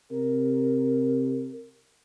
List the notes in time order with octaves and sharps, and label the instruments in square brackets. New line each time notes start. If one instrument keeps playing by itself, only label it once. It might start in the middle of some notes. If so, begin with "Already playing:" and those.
[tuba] C3 [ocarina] A#4